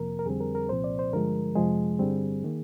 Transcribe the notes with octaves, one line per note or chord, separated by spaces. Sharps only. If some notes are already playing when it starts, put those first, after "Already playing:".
Already playing: F2 C3 F3 A#3 A#4
A#4
F2 D3 G3 C4 G#4
A#4
A#4
C2 A#2 F3 C4 C5
D5
C5
G2 D3 F3 G#3 A#4
F2 C3 F3 G#3 G#4
G2 D3 G3 C4
D#3 A#3